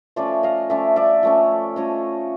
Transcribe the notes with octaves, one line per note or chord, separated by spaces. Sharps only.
F3 A3 C#4 D5 E5
D#5 F5
F3 A3 C#4 D5 E5
D5 E5
F3 A3 C#4
F3 A3 C#4 C#5 D#5